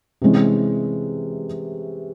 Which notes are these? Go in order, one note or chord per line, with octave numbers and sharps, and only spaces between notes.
C3 E3 G#3 C#4